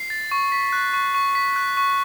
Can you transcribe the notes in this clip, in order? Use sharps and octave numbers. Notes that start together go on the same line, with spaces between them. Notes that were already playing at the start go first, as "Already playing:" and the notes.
Already playing: C7
A6
C#6
B6
F#6
C#6
C#6
B6
F#6
C#6